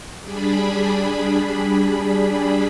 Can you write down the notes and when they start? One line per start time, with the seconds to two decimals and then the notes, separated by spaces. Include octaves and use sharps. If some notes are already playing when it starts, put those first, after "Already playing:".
0.23 G3 D4 G#4 B5